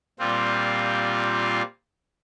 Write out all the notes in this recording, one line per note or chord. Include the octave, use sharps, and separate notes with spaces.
A#2 G3 C4 F4